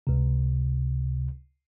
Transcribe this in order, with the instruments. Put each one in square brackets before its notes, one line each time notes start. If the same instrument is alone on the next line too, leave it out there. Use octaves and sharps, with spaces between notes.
[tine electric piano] C#2 C3